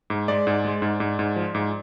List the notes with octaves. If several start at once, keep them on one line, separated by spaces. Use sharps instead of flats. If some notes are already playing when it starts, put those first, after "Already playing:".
G#2
G#3 D5
G#2
G#3
G#2
G#2
G#2
F3
G#2